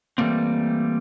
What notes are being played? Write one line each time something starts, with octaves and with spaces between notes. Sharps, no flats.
E3 F3 G3 A3 A#3 C4